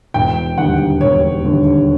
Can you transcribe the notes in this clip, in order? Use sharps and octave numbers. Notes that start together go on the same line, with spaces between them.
E1 G5
D#2 D3 G3 F#5
E1 C#5
D#2 D3 G3